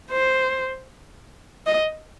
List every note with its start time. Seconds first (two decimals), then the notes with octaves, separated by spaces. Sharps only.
0.11 C5
1.66 D#5